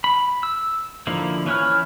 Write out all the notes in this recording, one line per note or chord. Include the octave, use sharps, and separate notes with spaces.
B5
E6
D3 F3 A#3 D#4 E4
E3 C#4 B4 C#5 F6